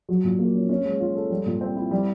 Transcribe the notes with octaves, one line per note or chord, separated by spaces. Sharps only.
F#3
A#2
A#3
C#4
C#4
G#3
F4
A4
G3
A#2
C4
E4
G3